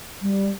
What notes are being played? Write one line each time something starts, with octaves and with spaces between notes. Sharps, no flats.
G3